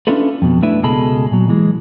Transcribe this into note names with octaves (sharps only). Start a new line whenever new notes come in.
C#4 D4 E4 F4 A4 B4
F2 B2
A3 D4 E4 B4 E5
C#2 B2 G#3 A4 B5
A#2 F#3
E3 G#3